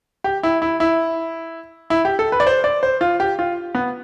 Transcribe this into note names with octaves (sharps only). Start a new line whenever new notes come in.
G4
E4
E4
E4
E4
G4
A4
B4
D5
C5
D5
C5
F4
G4
F4
B3